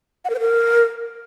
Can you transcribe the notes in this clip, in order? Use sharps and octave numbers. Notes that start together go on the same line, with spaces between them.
F#5
A#4
C5
A#4